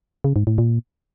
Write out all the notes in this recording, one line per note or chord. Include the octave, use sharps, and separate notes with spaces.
C#3
G#2
A2
A#2